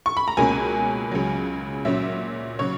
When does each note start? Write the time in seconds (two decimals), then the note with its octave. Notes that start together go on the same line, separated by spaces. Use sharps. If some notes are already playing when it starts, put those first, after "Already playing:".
0.06 C#6
0.17 B5
0.28 A#5
0.37 C#2 B2 A#3 C#4 G#5
1.11 C#2 C#3 F#3
1.85 A#2 F#3 C#4 E5
2.59 C#3 F#3 C#5